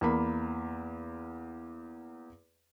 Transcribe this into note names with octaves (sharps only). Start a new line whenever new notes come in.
E2 A#3 B5